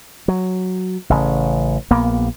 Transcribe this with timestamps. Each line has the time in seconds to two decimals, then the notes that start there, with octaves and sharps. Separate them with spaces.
0.28 F#3
1.10 A1 C#3
1.91 A#1 A#3 B3